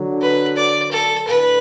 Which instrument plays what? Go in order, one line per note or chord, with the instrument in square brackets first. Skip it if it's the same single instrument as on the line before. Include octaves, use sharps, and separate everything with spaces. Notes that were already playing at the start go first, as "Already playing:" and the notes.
Already playing: [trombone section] D3 F#3
[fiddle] B4
D5
A4
[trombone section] A2 D3 [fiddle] B4